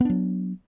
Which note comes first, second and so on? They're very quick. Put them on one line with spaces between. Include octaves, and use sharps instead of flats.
B3 D4 F#3